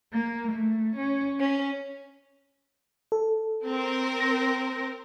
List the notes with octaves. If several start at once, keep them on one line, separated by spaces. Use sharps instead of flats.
A#3
A3
C#4
C#4
A4
C4 A#4
A#6